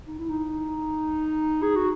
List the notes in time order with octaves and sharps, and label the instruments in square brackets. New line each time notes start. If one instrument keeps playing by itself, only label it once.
[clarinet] D#4
E4
D#4
G#4
F#4